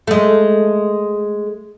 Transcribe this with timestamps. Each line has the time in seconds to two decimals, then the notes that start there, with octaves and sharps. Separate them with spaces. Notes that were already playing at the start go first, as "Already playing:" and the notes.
0.07 G#3 A3